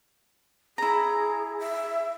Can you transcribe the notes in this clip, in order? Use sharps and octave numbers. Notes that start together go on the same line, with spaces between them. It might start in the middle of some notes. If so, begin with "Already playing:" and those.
E4 G#4 A#5
E5